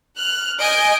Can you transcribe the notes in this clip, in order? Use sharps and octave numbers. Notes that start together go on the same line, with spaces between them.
F6 F#6
D#5 G#5 G6 D7